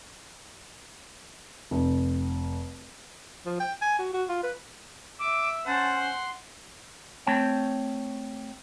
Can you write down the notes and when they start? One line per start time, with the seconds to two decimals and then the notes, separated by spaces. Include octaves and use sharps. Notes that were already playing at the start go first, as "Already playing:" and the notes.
1.71 F1
3.46 F3
3.60 G5
3.82 G#5
3.99 F#4
4.14 F#4
4.29 F4
4.43 B4
5.19 E5 D6
5.66 C#4 C5 F#5 A5
5.99 C6
7.27 A3 C4 C#5 G5 A5